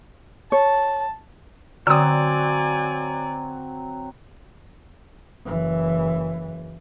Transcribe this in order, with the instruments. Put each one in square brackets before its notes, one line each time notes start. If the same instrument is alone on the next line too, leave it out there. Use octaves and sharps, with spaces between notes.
[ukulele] C#5 [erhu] A5
[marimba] D3 [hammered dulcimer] F#3 C4 [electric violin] D5 G#5 [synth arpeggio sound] D#6 E6
[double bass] F#1 E3